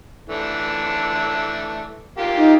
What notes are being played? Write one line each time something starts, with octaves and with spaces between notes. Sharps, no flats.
E3 A3 D4
A#3 F4 G4
D#4